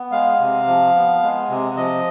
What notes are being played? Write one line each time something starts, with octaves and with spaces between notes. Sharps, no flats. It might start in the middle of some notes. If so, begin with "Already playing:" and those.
Already playing: B3
G#3 F5
C3
F3
B3
G#3
C3
F3 D#5